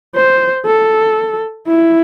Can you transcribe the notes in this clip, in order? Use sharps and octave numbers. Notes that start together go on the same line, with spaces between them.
C5
A4
E4